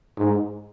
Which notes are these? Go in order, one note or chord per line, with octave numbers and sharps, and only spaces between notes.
G#2